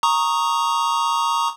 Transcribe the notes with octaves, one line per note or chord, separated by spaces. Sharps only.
A#5 C#6 D#6